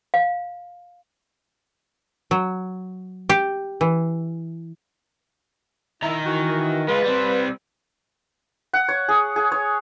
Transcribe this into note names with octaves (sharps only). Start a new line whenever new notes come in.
F5
F#3
G4
E3
D#3 E4 A#5
E3 F#4
G#3 F4 B4
G3 C4
F#5
C#5
G#4
G#4
C#5